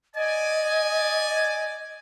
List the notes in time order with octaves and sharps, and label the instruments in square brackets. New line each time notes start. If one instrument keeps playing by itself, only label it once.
[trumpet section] D5 G#5 [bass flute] D#5